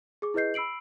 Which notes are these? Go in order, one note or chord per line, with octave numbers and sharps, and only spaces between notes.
G#4 D6
E4 G#4 B4 D#5 G6 C7
B5 E6 C7 D7 F#7